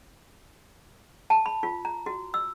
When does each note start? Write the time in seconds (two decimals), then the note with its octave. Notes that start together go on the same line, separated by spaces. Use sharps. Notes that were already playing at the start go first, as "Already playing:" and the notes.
1.30 A5
1.46 B5
1.63 F4
1.85 A#5
2.06 F#4
2.34 E6